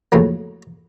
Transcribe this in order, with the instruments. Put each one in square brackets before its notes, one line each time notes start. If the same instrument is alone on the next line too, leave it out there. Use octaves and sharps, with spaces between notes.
[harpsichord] F2 A2 C#3 F#3 A#3